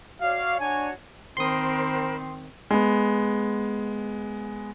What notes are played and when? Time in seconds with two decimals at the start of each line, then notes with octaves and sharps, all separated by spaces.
0.21 F#4 C#5 D5 F5
0.60 D4 F#4 C#5 G#5
1.37 D#3 C4 A#4 C5 B5 C6 D#6
2.71 G#3 B3